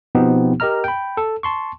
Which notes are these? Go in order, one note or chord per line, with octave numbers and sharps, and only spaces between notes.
B2 F3 B3 C4 D#4 G4
G4 A#4 D#5 A#5 F6
G5 B5
A4
A5 C6 C#6